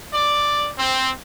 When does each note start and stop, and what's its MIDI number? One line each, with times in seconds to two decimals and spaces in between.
0.13 0.69 74
0.78 1.11 60